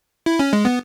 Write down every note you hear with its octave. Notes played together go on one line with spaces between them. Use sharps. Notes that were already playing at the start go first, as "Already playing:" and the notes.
E4
C#4
G#3
B3